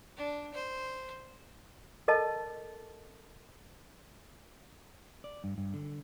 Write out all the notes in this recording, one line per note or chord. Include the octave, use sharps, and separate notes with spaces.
D4
C5
A4 A#4 D#5 A5
D5
G2
G2
D3